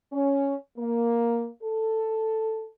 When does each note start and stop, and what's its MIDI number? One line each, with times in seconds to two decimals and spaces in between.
0.12 0.54 61
0.77 1.49 58
1.63 2.68 69